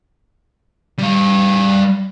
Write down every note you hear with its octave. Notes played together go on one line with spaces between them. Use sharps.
G3 F5